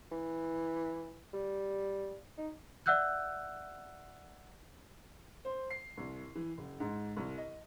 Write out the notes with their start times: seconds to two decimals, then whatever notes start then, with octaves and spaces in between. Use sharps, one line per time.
0.12 E3
1.34 G3
2.38 D#4
2.86 D5 E5 F#5 E6 F#6 G6
5.45 C5
5.70 C7
5.97 C2
6.35 E3
6.57 F#1
6.80 G#2
7.16 C2
7.38 D#5